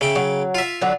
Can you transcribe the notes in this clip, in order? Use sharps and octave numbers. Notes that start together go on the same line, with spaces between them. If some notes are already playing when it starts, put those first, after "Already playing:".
C#3 E5 G5
F#3
F4 E5
D3 F#3 D5